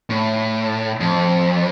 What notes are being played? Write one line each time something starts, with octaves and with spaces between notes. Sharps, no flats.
A2
F2